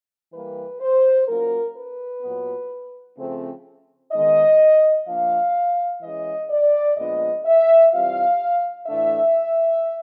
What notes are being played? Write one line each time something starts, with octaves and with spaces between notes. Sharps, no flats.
E3 G3 A#3 B4
C5
F#3 A#3 C#4 F4 A#4
B4
A#2 F#3 B3
C#3 F3 A3 C4
D#3 G#3 B3 D#4 D#5
F3 A#3 D4 F5
E3 G#3 C#4 D#5
D5
A#2 F3 G#3 B3 D4 D#5
E5
E3 G3 C4 F4 F5
A2 E3 A3 D4 E5